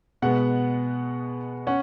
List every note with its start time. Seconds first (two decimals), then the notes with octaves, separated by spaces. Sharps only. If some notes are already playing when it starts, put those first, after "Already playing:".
0.22 B2 G#3 B3 F#5
1.67 C#4 F#5